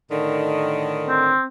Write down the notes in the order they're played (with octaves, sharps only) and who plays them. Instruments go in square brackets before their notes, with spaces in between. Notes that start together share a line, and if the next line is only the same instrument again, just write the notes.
[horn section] A2 D3 D#3
[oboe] C4